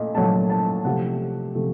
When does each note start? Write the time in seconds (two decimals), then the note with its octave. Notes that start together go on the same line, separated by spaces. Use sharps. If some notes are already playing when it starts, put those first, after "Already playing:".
Already playing: A#2 A3 D#5
0.15 A#2 F#3 A3 A5
0.50 A5
0.84 C3 F3 A3 F#5
1.55 C3 F3 A3